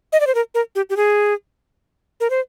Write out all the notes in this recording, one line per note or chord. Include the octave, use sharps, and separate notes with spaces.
D#5
D5
C5
A#4
A#4
G4
G4
G#4
A#4
C5